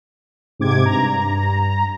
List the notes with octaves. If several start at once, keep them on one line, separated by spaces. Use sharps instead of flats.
G#2 C3 D6 G#6
G2 A#5